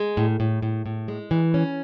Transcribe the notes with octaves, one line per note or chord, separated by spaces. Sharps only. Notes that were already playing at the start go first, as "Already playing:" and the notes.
Already playing: G#3
A2
A2
A2
A2
G#3
E3
C#4